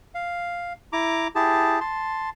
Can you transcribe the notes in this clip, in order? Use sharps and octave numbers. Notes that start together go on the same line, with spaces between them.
F5
E4 A#5 D6
E4 G4 G#4 A5
A5 C6